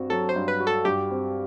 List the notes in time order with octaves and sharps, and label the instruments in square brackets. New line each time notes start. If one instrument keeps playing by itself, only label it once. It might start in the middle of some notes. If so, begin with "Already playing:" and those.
Already playing: [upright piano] G2 C4 F#4
[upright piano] F#3 [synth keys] A4
[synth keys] C5
[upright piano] G2
[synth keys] B4
[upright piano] F#4
[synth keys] A4
[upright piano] G2 [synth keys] G4
[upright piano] C4